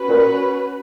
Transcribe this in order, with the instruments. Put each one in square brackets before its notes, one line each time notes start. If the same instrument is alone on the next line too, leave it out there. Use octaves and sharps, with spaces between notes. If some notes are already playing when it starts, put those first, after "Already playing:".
Already playing: [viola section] C#4 F#4 B4
[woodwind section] A#2